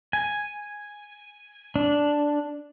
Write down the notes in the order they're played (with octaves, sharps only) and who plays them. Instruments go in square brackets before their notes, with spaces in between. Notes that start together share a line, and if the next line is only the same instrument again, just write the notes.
[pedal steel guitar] G#5
D4